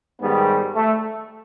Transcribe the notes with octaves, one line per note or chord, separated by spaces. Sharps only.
G#2 D#3 G3 B3
A3